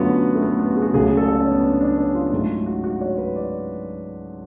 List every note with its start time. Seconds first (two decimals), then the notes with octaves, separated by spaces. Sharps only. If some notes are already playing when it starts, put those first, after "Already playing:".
Already playing: F#2 D3 F#3 A3 B3 F4 F#4
0.35 A3
0.42 B3
0.59 B3
0.70 F#4
0.77 G#4
0.82 F#4
0.93 C#2 C#3 F#3 A3 G#4
1.06 G#4
1.17 A4
1.28 A4
1.41 C#4
1.51 B3
1.63 D4
1.81 D4
1.97 C#4
2.14 F4
2.32 G#2 F#3 A3
2.66 F#4
2.84 F#4
3.01 C#5
3.18 B4
3.36 D5